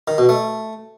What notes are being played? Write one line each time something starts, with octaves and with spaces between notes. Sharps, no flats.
D#3
B2
A3